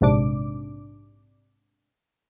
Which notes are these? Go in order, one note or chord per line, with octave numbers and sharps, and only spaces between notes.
A#1 G#2 C3 D4 D6